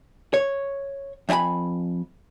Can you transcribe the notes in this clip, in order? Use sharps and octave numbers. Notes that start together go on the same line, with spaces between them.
C#5
F2 D#4 E4 G#5 B5